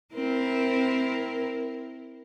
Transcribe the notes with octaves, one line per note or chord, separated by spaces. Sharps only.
C4 E4 A#4